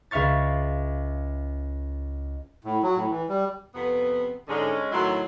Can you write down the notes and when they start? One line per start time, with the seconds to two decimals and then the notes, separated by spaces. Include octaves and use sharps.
0.11 C#2 E5 F5 C#6 A6
2.65 A2
2.83 F#3
2.96 A2
3.11 E3
3.29 G3
3.75 F2 C3 B3
4.48 G#2 D3 G#3 C#4
4.92 A2 D#3 F#3 E4 C6